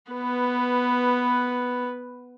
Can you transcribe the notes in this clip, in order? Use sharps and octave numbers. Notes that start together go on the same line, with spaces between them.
B3 B4